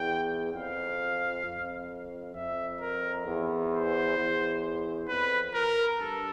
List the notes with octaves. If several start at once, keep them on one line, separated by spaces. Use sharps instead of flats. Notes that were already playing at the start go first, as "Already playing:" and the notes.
Already playing: E2 G5
F2 F5
F2
F2 E5
A#4
E2
C5
E2
F2 B4
A#4
G2 A4